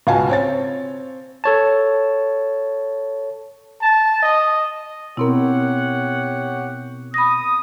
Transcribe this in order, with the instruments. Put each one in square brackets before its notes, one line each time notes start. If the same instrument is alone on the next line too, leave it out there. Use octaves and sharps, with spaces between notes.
[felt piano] C#2 B2 F5 G#5 A5
C4 C#5 A6
[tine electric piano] A4 C#5 A5
[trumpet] A5
D#5
[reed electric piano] B2 A#4 [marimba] B3 C4 E4 [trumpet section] G4 C#5 F#5
[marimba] B5 A#6 [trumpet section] D#6